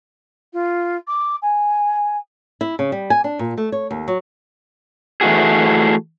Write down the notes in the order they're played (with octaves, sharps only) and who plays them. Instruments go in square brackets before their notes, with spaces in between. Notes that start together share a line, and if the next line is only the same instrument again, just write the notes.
[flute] F4
D6
G#5
[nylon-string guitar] E4
C#3
G3
G#5
D4
A#2
A3
C#5
D#2
F#3
[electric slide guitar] E3 A3 F#4 G#4